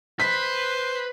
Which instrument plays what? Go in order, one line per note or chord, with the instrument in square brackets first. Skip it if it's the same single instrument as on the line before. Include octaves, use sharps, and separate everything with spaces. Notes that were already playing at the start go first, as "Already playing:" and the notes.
[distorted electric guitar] B4 [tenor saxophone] C5 [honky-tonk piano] B6